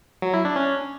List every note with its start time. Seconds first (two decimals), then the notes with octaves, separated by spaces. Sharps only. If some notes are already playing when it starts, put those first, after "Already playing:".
0.22 F#3
0.34 E4
0.45 D4
0.56 C#4